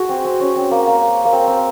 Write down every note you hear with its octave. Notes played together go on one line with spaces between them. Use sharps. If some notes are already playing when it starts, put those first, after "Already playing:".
Already playing: F#4 G#4
C4
C4
C#4
C4
A#3
A#3
A#3
C4
C4